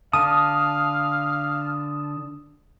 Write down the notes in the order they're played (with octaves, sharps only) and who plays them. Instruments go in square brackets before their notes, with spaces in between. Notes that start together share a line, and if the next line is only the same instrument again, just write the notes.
[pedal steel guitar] D3 A5 [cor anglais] F5 [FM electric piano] D#6